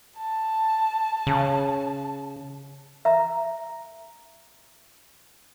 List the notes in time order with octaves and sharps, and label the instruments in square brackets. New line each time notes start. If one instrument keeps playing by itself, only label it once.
[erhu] A5
[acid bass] C#3
[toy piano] E5 A#5